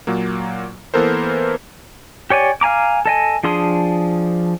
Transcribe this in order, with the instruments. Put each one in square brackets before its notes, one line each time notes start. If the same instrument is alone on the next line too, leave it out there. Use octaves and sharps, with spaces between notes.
[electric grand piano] A#2 F#3 A#3
E3 A#3 B3 A4 A#4 C5
[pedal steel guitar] G4 C#5 D5 G#5
F5 G#5 A#5 D6
A4 D#5 G#5
F3 D4 G#4 C6 D#6